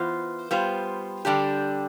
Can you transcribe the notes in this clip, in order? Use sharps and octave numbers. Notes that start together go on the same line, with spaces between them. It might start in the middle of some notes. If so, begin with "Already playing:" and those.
Already playing: E3 B3 F4 C5
G3 B3 F4 C5
D3 G3 D4 G4